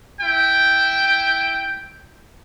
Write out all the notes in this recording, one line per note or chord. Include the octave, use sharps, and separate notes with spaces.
E4 G5